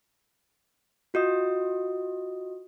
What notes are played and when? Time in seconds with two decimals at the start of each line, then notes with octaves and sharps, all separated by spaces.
1.14 F4 F#4 D#5 D#6